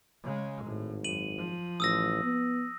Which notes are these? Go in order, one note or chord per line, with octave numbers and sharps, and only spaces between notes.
C#3 G#3
G#1 A2
F#2 D#7 F#7
F3
A1 D#6 E6 A#6
B3